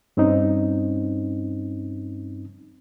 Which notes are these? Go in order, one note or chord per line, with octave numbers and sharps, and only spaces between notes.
G2 C4 C#4 D#4